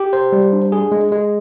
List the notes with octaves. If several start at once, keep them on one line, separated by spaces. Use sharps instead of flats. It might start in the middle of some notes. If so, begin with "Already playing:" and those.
Already playing: G4
C5
G3
D4
G#4
G#3
G#3